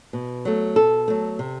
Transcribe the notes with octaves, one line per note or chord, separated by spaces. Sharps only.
B2
F#3 A3
B2 A4
F#3 A3
C3